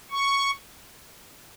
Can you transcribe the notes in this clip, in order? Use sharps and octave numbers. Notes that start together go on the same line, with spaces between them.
C#6